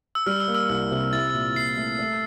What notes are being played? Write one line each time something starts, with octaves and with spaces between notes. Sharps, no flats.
E6
G3 F6
E6
A#3
E6
C2 F6
C3
E4 A6
A#2
A#2 C7
A3
A3